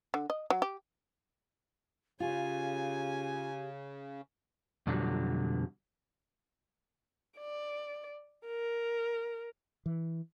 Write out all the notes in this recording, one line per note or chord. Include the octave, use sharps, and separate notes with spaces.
D3
D#5
F#3
G4
C#3 F4 G4 G#5
F2 B2 D3 F#3 G3
D5
A#4
E3